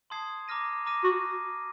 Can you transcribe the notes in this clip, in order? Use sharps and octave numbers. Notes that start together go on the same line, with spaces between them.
A5 C6 D#6 G#6 C7
A#5 D6 F6 A#6 D#7
A#5 D6 F6 A#6 D#7
F#4